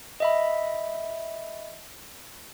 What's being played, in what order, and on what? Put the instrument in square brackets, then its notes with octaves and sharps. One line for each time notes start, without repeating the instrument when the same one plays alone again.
[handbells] D#5 E5 B5